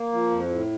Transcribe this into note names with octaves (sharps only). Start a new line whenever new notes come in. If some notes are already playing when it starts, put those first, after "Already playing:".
Already playing: A#3
F3
F2
A2